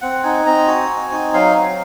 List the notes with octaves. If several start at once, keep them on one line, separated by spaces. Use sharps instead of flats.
C4 F#5
D#4 G#5
C4 A#5
F#4 G#5
C4
D#4
F#3 F5
C4